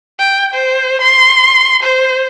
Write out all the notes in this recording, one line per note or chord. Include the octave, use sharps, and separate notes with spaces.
G5
C5
C6
C5